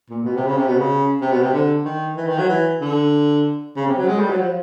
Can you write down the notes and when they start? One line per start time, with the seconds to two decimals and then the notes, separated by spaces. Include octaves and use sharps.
0.10 A#2
0.25 B2
0.36 C3
0.47 C#3
0.57 C3
0.68 B2
0.79 C#3
1.21 C3
1.31 B2
1.42 C3
1.53 D3
1.85 D#3
2.17 E3
2.27 D#3
2.38 F#3
2.49 E3
2.81 D3
3.76 C#3
3.87 C3
3.97 F#3
4.08 G#3
4.19 G3
4.29 F#3
4.40 F3